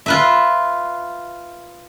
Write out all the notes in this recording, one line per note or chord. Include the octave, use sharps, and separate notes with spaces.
F4 B4 E5